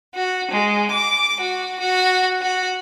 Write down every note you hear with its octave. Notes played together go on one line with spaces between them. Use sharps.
F#4
G#3
D6
F#4
F#4
F#4